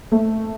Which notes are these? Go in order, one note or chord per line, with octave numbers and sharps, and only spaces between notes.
A3